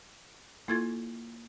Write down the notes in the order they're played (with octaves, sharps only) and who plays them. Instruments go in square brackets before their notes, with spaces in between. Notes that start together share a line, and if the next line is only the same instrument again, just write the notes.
[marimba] A#3 G#6 A6 [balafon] E4 F4 A4